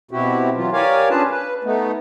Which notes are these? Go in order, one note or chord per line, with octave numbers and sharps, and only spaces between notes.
B2 C4 E4 F#4 G4
E3 F#3 F4
G4 A#4 C#5 D5 F5 G#5
C#4 D4 F4 G#4 B4 A5
B4
A3 B3 D#4